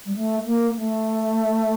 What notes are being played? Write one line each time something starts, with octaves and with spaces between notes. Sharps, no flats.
G3
A3
A#3
A3